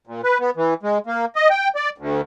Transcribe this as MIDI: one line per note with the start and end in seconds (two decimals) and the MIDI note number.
0.07 0.21 46
0.24 0.38 71
0.40 0.50 59
0.57 0.74 52
0.83 0.98 56
1.07 1.25 58
1.36 1.48 75
1.50 1.68 79
1.75 1.89 74
1.98 2.21 38